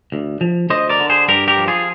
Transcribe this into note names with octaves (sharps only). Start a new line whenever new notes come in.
D2
F3
D2 C5 D#5
A#4 D5
D3
G#4 C5
G2 G4 A#4
G4 A#4
F3
F4 G#4